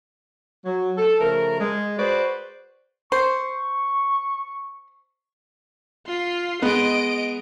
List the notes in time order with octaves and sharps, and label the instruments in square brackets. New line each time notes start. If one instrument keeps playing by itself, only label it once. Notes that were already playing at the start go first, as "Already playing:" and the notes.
[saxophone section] F#3
A4
C#3 F3 A3 A#4
G#3
F#4 G#4 B4 C5 D5
[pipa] C5 [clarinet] C#6
[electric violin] F4 C6
[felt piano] G#3 B3 [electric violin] D#5 D7